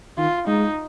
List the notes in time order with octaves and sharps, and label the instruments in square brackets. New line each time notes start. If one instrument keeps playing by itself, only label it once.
[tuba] D#3 [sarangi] F4
[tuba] G#3 [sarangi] D#4